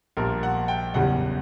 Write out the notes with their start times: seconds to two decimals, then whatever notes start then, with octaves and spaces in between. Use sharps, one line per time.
0.17 A#1 A#2 G3 A#4
0.43 F#5
0.68 G5
0.94 F#1 E2 C#3 E3 G3 F#5